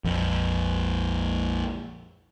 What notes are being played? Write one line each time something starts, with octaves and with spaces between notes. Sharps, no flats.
A#1 F2